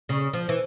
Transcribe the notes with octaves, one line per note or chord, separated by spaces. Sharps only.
C#3
F3
E3